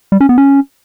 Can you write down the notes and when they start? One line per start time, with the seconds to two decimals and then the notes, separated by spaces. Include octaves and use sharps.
0.12 G3
0.21 C#4
0.29 B3
0.38 C#4